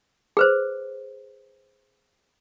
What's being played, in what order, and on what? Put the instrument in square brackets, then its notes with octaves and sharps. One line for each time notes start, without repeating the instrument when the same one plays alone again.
[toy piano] G#4 B4 C5